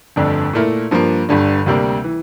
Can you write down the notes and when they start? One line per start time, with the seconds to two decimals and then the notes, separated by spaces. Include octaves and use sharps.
0.16 G1 F2 D3 A3 D4
0.53 A#2 A3 E4 A#4
0.91 G2 F3 A#3
1.29 G1 G2 D3
1.66 D2 C3 G3 A#3 D4
2.04 E3